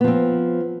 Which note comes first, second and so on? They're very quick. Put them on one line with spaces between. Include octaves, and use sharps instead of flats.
B3 F3 C4